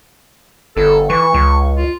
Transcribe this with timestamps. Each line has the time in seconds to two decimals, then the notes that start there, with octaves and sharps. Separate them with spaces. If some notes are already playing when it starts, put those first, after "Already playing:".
0.77 G1 A4
1.10 E3 C#6
1.34 C#2
1.77 F4